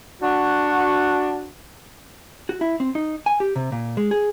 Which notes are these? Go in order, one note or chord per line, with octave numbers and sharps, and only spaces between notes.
D4 F#4
F#4
E4
C4
D#4
G#5
G4
C3
A#2
G#3
G#4